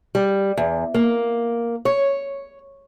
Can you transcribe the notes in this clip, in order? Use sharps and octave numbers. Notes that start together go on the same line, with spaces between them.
G3
E2
A#3
C#5